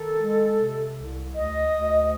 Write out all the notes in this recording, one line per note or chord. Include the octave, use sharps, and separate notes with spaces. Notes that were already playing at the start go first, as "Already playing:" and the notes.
Already playing: D#3 A4
G#3
C3
C2
D2 D#5
D2